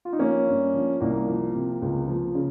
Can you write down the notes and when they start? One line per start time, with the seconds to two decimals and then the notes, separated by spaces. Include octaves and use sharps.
0.05 F4
0.13 D#4
0.19 F3 A#3 C#4
0.47 G2
0.74 F3
1.00 C2 A#3
1.27 F3
1.55 C3
1.82 C#2
2.08 F3
2.35 C#3